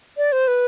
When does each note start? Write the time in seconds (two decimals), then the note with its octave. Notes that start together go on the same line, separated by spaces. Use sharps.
0.17 D5
0.32 C5
0.48 B4